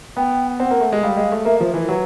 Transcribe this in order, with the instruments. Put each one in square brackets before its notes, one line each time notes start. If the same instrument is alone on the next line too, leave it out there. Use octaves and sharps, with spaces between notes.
[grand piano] B3 [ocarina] G5
[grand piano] C4 [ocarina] F#5
[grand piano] A#3
A3
G#3
[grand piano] G3 [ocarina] F5
[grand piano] G#3
A3
[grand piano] A#3 [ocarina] E5
[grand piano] F3 [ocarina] C5
[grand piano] E3 [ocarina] B4
[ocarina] A#4
[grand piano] F#3 [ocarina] B4